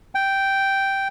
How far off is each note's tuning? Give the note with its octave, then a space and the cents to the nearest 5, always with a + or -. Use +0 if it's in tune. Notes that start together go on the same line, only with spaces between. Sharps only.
G5 -5